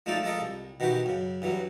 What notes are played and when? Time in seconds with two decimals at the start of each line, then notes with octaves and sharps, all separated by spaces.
0.06 F3 G#3 A3 D#4 F4 D5
0.23 F3 G#3 A4 A#4 D#5
0.40 C2
0.80 B2 D#3 E3 F#4 G4
1.06 F#2 C#3
1.42 G2 E3 F#3